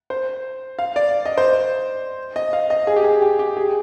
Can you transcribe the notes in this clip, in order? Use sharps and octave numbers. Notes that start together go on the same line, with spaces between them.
C5
F5
D5
D#5
C5
D#5
F5
D#5
G#4
G4
G#4
G4
G4
G#4